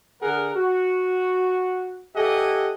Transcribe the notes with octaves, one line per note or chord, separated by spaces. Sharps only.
D3 G#4 A#4 F#5
F#4
G4 A4 D#5 E5 F#5 G#5